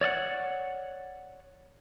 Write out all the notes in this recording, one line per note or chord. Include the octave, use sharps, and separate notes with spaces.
C#5 D5 E5 F#5